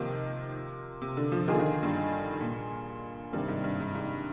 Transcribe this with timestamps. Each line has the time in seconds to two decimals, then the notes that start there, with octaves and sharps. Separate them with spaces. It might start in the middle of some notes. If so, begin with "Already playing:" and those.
Already playing: C3 D#3 F3 A#3 F4 A#4
1.02 C3
1.17 D3
1.32 F3
1.48 D#3 A#3 F4 G#4
1.54 D3
1.59 D#3
1.83 G2
2.41 A#2
3.33 G2 C3 D#3 G3 A#3
3.48 G#2
3.64 G2
3.80 G#2
3.95 G#2